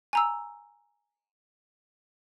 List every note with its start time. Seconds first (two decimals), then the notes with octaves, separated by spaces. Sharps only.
0.13 G#5 A#5 E6